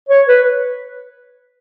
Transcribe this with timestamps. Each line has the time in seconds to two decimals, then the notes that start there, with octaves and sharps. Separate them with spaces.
0.09 C#5
0.28 B4